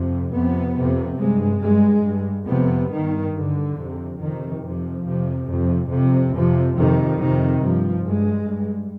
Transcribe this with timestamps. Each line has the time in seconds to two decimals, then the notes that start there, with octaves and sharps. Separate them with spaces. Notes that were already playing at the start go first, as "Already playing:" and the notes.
Already playing: F2 C3
0.34 F2 C3 B3
0.77 F2 C3
1.20 G2 G#3
1.63 G2 G#3
2.05 G2
2.48 F2 C3 B3
2.91 G2 D#3
3.34 G2 D3
3.77 F2 C3
4.19 F2 C3 D#3
4.62 F2 C3 F3
5.05 F2 C3
5.48 F2 C3
5.90 F2 C3
6.33 F2 C3 F3
6.76 F2 C3 D#3
7.19 F2 C3 D#3
7.62 G2 F3
8.05 G2 G#3
8.47 G2